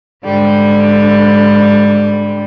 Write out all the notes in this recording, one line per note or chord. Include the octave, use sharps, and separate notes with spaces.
G#2 D3 G3